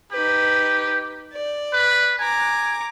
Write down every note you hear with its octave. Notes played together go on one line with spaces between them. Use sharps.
D#4 G4 B4
D5
B4
G#5 A#5 D6